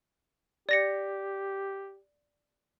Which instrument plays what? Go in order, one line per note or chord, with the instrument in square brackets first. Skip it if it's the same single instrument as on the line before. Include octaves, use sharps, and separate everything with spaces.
[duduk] G4 [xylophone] D5 A#6 C#7